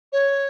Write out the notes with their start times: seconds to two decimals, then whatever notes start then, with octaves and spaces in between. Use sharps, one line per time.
0.13 C#5